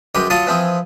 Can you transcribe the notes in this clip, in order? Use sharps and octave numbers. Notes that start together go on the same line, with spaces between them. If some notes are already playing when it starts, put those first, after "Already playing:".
F#2 G#3 B4 G5 D6
F#3 F4 F#4 A5 C6 D#6
E3 F3 C4 G#4